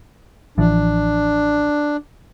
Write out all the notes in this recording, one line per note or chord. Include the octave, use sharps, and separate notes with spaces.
A1 E3 F3 D4